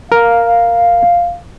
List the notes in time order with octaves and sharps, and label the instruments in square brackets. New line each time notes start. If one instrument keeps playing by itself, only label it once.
[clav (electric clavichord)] A#4 [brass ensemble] F5